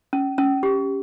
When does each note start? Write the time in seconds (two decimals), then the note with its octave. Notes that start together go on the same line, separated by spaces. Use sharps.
0.13 C#4
0.38 C#4
0.63 G4